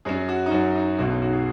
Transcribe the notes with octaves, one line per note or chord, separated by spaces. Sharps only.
F#2 F#3 C#4 G#4
F#4
D#4
F#2 F#3 C#4 F#4
D#4
B1 B2 G#3 C#4 F#4
D#4
F#4
G#4